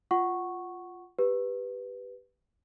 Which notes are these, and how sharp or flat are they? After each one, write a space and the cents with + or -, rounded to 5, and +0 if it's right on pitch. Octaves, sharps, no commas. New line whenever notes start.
F4 +0 F#5 +10 C#6 -5
G4 +5 B4 +0